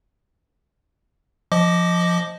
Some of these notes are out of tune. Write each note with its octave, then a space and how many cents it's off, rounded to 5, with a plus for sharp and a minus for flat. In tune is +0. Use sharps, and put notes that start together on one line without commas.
F3 +0 D#5 +0 D6 +0